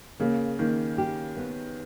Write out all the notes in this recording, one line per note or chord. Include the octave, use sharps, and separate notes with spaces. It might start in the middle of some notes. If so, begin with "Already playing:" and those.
C#3 A#3
D#3 A#3
G4
B3